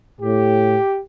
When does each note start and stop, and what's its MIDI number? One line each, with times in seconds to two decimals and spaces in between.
0.21 0.78 45
0.21 0.99 67